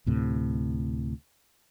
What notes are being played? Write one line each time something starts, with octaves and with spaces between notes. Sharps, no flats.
D2 A2 C3